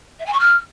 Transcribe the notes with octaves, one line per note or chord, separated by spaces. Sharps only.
E5
G#5
C#6
F6